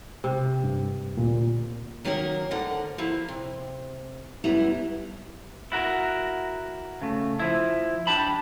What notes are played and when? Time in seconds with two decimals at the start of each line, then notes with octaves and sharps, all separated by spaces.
0.24 C3
0.64 G2
1.15 D2 A#2
2.05 D#3 F#3 A#3 C#4 E4 A#4
2.51 D2 D3 A#4 F#5
2.98 F3 A#3 E4
3.28 C3
4.44 F#2 G3 B3 E4 A#5
5.72 E4 F#4 A#4
7.02 C#3 A3
7.39 F3 E4
8.07 D4 G4 A5 B5